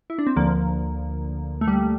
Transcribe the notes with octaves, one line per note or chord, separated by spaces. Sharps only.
E4
D4
C4
D2 D3 F3 A#3
A3
G3